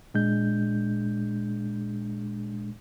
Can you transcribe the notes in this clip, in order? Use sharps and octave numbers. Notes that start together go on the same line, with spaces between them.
A#2 G#3 D4 G6